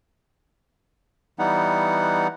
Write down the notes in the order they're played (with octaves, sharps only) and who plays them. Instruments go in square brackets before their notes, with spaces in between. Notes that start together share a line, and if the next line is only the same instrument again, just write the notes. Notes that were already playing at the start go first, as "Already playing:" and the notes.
[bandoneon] E3 G3 B3 D#4 F#5